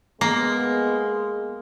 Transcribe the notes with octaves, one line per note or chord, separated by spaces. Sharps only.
G#3 A#3 B3